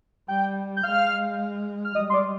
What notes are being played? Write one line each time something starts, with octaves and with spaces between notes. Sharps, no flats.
G3 G5 G6
G6
G#3 F5 F6
F6
G3 D#5 D#6
C6
D5 D6